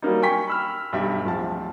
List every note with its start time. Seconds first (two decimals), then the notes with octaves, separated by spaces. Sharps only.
0.02 F#3 G3 A#3 D#4
0.22 G5 G#5 C#6 B6
0.48 B5 E6 F6
0.92 B1 G2 G4 E5
1.25 D1 F3 A5